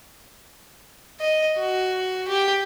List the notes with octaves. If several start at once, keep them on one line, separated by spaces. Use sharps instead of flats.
D#5
F#4
G4